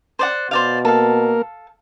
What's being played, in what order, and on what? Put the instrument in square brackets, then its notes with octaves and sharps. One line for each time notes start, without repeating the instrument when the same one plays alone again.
[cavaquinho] C5 D5 F#5
[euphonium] B2 [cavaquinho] C5 D5 F5
[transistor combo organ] A#3 A#4 [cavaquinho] A4 F5